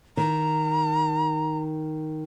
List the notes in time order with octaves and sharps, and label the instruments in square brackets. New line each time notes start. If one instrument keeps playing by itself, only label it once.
[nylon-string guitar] D#3 [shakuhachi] A#5